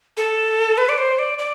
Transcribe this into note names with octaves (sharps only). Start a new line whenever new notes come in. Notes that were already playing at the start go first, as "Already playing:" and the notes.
A4
B4
D5
C5
D5
D5